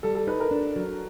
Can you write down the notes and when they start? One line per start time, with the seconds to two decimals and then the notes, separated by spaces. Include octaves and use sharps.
0.03 G3 A4
0.15 A4
0.27 D#4 B4
0.40 A#4
0.51 D4
0.76 F#3